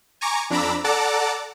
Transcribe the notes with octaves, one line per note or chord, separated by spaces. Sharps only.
G#5 A#5 C#6 D6
F2 D4 A#5 B5 D6 E6
A4 D5 F#5 A5 A#5 D6